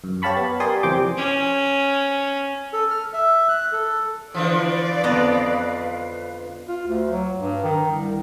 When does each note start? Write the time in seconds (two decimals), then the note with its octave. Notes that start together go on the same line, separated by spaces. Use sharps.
0.04 F#2
0.22 G4 C#5 F5 A5 B5 C#6
0.37 B3
0.60 G4 A#4 D5 G#5 C6 D#6
0.83 F2 C3 E3 G5 C6 D6
1.17 C#4
2.73 A4
2.91 F6
3.13 E5
3.49 F#6
3.72 A4
4.34 D3 E3 F3 B4 D5 F5
5.04 F2 B3 D#5
6.67 F4
6.87 D2
7.11 F#3
7.38 G2
7.64 D#3
7.91 C2